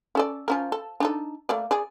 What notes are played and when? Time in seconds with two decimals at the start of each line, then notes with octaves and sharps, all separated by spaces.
0.15 C#4 A4 D5
0.48 F3 C#4 A#4
0.72 A4
1.00 D4 D#4 A4
1.49 A3 A#3 D5
1.71 G#4 D5